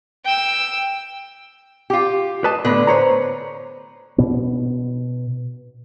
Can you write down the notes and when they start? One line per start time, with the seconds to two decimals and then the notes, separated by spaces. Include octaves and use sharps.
0.24 G5 E6
1.90 F4 G4
2.44 B4 D#5 A5
2.65 A2 D3 B3 B4
2.87 C5 C#5 A#5
4.18 B2 B3